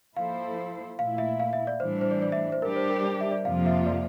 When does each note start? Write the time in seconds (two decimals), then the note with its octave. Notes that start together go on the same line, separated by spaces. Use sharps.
0.15 F3 A#3 E4 A4 C5 F5
0.98 A#2 A3 E4 F5
1.18 E5
1.40 F5
1.53 E5
1.67 D5
1.80 A2 E3 G3 D4 C5
2.01 C5
2.11 D5
2.22 D5
2.32 E5
2.52 C5
2.62 G3 D4 G4 A#4
2.76 C5
2.90 A#4
3.04 D5
3.21 E5
3.31 D5
3.45 F2 C3 F3 A#3 F4 F5
3.66 E5
3.86 D5